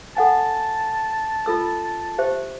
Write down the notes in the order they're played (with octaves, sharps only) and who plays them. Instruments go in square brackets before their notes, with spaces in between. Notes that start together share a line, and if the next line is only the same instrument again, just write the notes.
[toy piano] A4 F#5 G#5 [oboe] A5
[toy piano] F4 A4 E6
G4 C5 E5